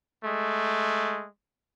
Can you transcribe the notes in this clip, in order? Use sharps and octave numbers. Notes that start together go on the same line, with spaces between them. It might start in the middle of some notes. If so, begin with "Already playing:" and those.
G#3 A3